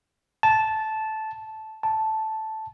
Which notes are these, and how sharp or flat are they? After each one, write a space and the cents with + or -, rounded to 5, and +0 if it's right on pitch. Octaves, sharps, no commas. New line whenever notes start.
A5 -10
A5 -5